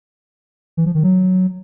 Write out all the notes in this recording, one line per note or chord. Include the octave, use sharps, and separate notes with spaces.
E3
F3
D#3
F#3